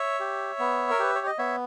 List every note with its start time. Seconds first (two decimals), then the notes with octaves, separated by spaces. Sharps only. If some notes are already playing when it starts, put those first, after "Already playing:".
Already playing: C#5 E5
0.20 G4
0.59 B3
0.90 A#4
0.99 G4 B4
1.15 C#5
1.26 D#5
1.38 B3 C#5 E5